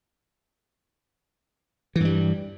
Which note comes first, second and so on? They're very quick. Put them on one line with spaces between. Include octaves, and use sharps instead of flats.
E3 G2 G3